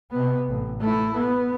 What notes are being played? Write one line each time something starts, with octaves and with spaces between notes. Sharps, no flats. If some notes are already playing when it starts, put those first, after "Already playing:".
C3 B3
A1
A3 E4
B3